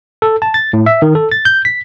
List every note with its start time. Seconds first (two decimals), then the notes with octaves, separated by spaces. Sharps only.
0.22 A4
0.42 A5
0.54 A6
0.73 A2
0.86 E5
1.02 D#3
1.15 A4
1.32 A6
1.45 G6
1.65 B6